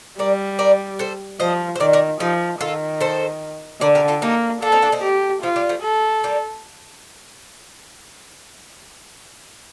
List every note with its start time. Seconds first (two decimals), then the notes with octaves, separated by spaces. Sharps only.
0.19 G3 A#4 D5
0.59 A#4 D5
0.99 A4 C5
1.40 F3 C5 D#5
1.76 C5
1.80 D#3 A#4 D5
1.93 A#4 D5
2.20 F3 D#4 G4
2.61 D#3 F4 A4
3.01 A4 C5
3.81 D3 A#4 D5
3.95 G4 A#4
4.08 F4 A4
4.22 A#3 D#4 G4
4.62 D4 F4 A4
4.72 C4 D#4
4.82 A#3 D4
4.92 C4 D#4
5.03 G4
5.42 F3 F4
5.56 G3
5.69 F3 A3
5.83 A4
6.24 G3 A#3